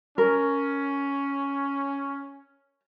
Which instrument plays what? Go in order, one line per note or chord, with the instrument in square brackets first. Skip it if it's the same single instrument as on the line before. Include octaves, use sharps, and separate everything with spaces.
[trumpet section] C#4 [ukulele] A#4